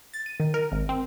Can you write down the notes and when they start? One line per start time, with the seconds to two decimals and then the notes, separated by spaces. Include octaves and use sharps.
0.14 A6
0.26 D#7
0.40 D#3
0.54 A#4
0.72 G#1
0.89 C4